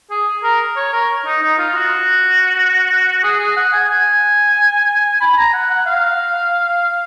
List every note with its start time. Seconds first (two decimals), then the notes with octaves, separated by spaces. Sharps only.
0.10 G#4
0.43 A#4
0.76 C#5
0.93 A#4
1.26 D#4
1.42 D#4
1.58 F4
1.75 F#4
3.24 G#4
3.40 G#4
3.56 F#5
3.73 G#5
3.89 G#5
5.21 B5
5.37 A#5
5.53 F#5
5.70 F#5
5.86 F5